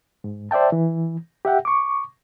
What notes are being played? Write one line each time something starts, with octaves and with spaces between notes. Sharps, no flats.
G#2
C5 D5 E5 G5 A5
E3
G4 E5 F#5 G5
C#6 D6